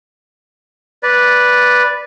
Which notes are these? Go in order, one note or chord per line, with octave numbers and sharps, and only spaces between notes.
B4 D5